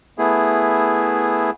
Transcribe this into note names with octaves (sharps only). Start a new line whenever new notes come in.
A3 B3 E4 G#4